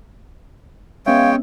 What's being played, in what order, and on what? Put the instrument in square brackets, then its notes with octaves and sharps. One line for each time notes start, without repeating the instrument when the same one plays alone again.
[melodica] G#3 C#5 G5 [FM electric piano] B3 C#4 E5 [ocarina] F5